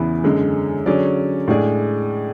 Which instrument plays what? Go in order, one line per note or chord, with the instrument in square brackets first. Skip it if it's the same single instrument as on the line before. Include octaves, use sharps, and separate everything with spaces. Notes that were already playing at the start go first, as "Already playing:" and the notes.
Already playing: [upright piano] E2 C#3 E3 B3 E4
F#2 D3 G#3
D3 F#3 C#4 G#4 D5
A2 G#3 D4 G#4 D5